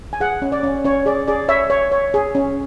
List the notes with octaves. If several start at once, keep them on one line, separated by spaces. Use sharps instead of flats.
G#5
G#4 F#5
C#4
D5
C#4
C#4 C#5
G#4 D5
G#4 D5
C#5 E5
C#5
C#5
G#4
C#4